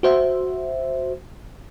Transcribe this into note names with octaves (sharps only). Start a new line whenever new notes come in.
F#4 C5 E5